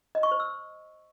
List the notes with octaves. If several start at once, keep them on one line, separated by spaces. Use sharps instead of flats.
D#5
C#6
C5
E6